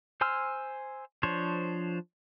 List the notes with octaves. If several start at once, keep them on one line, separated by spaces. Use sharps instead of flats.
C5 G#5 C6 E6 F6
F3 D4 C5 C#5